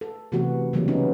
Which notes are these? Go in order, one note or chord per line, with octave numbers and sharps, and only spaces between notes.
A4
C3 E3 A3 B3 F#4
C#3 E3 F#3 G3 A#3
B3 C#4 D#4